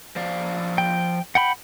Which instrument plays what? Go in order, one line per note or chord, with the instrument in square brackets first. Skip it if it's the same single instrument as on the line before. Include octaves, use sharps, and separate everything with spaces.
[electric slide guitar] F3 D5 F5
[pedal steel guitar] G5
F#5 G5 B5